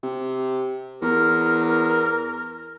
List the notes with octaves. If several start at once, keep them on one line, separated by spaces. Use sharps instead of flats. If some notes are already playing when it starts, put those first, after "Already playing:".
C3
E2 A#4